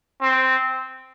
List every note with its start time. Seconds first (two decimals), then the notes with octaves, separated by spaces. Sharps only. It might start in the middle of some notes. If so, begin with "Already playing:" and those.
0.22 C4